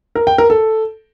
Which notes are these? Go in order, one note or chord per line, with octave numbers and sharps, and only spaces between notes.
A#4
G5
A#4
A4